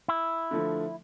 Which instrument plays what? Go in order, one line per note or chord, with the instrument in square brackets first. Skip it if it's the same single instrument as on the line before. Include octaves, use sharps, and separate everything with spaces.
[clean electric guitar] E4
[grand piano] D3 F3 A3